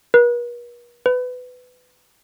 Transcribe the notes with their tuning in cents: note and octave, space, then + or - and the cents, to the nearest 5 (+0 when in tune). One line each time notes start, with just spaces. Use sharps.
B4 -45
B4 +20